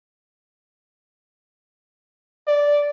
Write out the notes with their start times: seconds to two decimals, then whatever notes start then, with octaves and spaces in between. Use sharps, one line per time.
2.47 D5